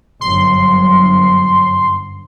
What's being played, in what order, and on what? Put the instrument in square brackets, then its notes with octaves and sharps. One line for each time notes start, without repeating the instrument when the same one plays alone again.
[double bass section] G1 F#2 F#3 [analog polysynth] C6